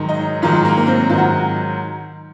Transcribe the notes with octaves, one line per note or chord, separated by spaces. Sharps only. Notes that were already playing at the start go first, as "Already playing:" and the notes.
Already playing: G#2 D#3 F#3
D#4
G#2 D#3 F#3 F4
A#3
A#3
C4
G#2 D#3 F#3 F4
F#4